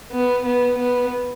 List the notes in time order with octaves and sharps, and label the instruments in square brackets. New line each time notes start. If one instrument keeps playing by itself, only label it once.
[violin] B3
B3
B3